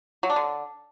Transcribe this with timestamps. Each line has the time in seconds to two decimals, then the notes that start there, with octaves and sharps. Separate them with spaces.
0.23 F#3
0.30 D4
0.36 D3